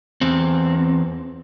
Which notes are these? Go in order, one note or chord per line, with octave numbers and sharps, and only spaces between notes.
E2 C4